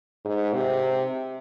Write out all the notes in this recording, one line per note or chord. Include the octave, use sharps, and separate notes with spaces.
G#2
C3